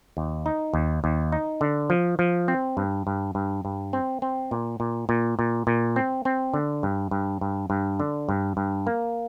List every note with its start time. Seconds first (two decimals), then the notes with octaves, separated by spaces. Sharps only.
0.17 D#2
0.46 D#4
0.74 D#2
1.04 D#2
1.32 D#4
1.61 D3
1.90 F3
2.19 F3
2.48 C4
2.77 G2
3.07 G2
3.35 G2
3.65 G2
3.93 C4
4.22 C4
4.51 A#2
4.80 A#2
5.09 A#2
5.39 A#2
5.67 A#2
5.96 C4
6.25 C4
6.54 D3
6.83 G2
7.11 G2
7.41 G2
7.70 G2
8.00 D3
8.29 G2
8.57 G2
8.87 A#3